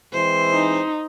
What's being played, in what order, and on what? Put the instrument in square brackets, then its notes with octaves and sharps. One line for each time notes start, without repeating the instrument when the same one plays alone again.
[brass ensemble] E3 G#3 C4 [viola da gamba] C5
[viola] D#4